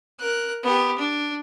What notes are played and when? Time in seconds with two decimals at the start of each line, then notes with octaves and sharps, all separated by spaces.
0.20 A#4 F#6
0.63 B3 G4
0.98 D4